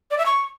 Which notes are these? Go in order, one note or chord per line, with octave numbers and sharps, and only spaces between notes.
D5
E5
C#6